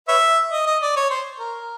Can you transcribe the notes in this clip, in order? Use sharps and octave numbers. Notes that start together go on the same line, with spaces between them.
B4 C#5 E5
D#5
D#5
D5
C#5
C5
A#4